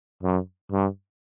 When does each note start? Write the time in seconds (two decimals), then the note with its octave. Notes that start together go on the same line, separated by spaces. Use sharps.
0.23 F#2
0.72 G2